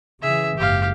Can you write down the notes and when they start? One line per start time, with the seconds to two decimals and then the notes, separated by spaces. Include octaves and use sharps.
0.22 C#3 E3 G#4 E5
0.58 F#1 G#2 G4 F5